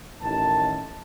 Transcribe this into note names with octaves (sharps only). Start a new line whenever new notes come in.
A1 D#3 A5